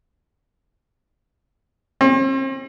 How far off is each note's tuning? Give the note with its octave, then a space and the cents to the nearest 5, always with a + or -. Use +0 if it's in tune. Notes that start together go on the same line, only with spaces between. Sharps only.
C4 +45